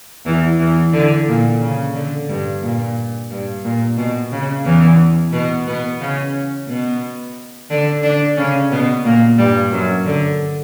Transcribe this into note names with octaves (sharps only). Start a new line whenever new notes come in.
E2 E3
E2 E3
D3
A#2
C#3
D3
G2
A#2
G2
A#2
B2
C#3
E2 E3
B2 B3
B2 B3
C#3 C#4
B2 B3
D3 D4
D3 D4
C#3 C#4
B2 B3
A#2 A#3
G2 G3
F#2 F#3
D3